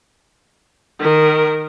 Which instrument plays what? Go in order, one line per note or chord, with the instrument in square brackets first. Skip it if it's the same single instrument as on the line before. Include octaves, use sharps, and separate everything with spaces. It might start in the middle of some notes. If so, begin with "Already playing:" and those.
[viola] D#3 A#4